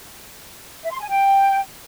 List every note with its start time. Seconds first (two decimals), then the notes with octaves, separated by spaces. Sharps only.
0.84 E5
0.92 C6
1.01 G#5
1.09 G5